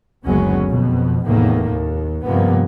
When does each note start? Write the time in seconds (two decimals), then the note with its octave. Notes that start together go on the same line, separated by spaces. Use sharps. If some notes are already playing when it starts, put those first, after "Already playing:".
0.25 F#1 D2 F#3 G#3 B3 C#4
0.70 F2 B2
1.26 F1 E2 A2 D#3 A#3
1.72 D#2
2.25 G2 C3 F3 A#3 B3